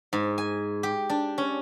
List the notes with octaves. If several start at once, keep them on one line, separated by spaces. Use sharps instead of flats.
G#2
G#5
G4
D4
C#4